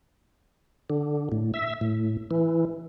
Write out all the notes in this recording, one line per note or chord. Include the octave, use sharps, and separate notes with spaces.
D3
A2
E5
A2
E3